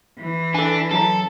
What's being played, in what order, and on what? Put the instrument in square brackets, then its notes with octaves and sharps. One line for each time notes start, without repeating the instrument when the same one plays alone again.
[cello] E3
[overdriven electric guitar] D4 [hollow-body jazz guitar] A4 G#5
[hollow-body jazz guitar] F#2 G#4 A#5 [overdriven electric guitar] A4